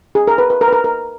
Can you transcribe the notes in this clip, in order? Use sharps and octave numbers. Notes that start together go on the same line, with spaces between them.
G#4
A#4
B4
B4
A#4
B4
A#4
A#4